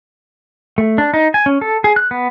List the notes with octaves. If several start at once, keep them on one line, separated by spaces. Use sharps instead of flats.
A3
D4
D#4
G#5
C#4
A4
G#4
F#6
B3